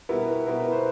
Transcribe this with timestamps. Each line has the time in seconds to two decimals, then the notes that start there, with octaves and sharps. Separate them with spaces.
0.09 B2 G3 B3 E4 A#4
0.47 B2 G3 B3 E4 A#4
0.60 B4
0.72 C5